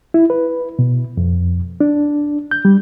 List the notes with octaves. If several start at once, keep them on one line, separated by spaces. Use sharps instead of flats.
E4
B4
B2
F2
D4
G6
G3